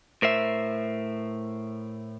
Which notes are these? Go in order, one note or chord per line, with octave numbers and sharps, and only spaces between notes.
A2 A#4 C5 E5